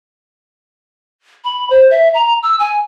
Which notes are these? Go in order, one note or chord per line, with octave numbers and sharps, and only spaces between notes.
B5
C5
E5
A#5
E6
G#5